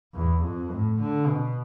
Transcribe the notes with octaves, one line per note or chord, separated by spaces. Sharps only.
E2
F2
A2
D3
B2